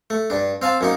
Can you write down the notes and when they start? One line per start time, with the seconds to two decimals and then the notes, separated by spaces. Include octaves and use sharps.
0.10 A3
0.30 G2 D4
0.62 C4 F5 G#5 A5
0.81 F#2 A#3 D#4